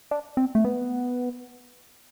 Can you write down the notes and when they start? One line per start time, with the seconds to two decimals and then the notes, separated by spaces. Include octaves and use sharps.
0.11 D4
0.37 C4
0.55 A3
0.64 B3